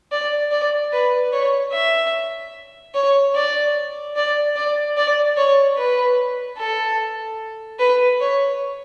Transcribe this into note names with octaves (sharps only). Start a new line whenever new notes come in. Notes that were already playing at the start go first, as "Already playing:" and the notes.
D5
D5
B4
C#5
E5
C#5
D5
D5
D5
D5
C#5
B4
A4
B4
C#5